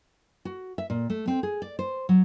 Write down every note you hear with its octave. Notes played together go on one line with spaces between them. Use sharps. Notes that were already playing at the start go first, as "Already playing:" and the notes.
F#4
E5
A#2
A3
C4
G#4
D5
C5
F#3